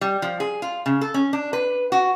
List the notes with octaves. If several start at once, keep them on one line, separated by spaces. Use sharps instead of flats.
G3
F3
G#4
F4
C#3
A4
C#4
D4
B4
F#4